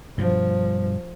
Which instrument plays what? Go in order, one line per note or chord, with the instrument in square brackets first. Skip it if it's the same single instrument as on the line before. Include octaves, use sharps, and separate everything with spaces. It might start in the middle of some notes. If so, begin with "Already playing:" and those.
[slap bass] G2 B2 G3 [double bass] F3